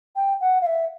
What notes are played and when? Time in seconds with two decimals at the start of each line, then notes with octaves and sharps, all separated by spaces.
0.15 G5
0.40 F#5
0.61 F5
0.66 E5